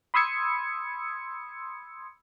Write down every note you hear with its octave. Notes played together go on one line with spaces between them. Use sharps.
B5 C6 D#6 E6 G#6 C#7